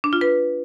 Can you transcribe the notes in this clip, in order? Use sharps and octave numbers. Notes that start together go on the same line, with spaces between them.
D4
F4
B4